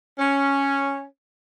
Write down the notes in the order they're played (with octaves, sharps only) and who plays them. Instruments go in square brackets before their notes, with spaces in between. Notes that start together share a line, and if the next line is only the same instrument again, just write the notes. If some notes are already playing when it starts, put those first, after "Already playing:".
[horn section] C#4